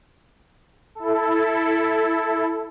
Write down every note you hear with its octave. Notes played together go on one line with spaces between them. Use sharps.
E4 A4